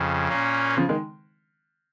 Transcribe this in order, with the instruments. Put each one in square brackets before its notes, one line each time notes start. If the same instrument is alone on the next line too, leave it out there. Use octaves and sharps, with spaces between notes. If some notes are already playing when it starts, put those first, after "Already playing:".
Already playing: [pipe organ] F2 C#3
A#2 A#3 C#4
[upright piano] C#3 F3
D#3 G#3